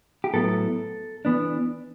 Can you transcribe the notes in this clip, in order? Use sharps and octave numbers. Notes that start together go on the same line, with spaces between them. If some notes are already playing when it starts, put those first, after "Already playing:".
G4
A2 F#3 B3 E4 A4
E3 B3 D4